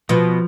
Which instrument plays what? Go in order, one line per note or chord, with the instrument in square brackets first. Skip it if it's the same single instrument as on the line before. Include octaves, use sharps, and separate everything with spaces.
[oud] B2 [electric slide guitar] F3